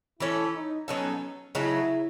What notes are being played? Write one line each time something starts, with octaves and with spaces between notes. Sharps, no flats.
E3 A3 C#4 E4
D#4
F#3 B3 C#4 D#4 A4
C#3 F#3 A3 D#4 E4